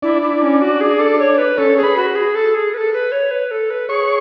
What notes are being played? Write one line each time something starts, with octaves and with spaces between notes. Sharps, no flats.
D4 E4 D5
E4
C#4
F#4
G#4
A4
C#5
B4
C#4 A4 C#5
G#4
B4 B5
F#4
G#4
A4
G#4
B4
A4
B4
C#5
B4
A4
B4
G#4 C#5 C#6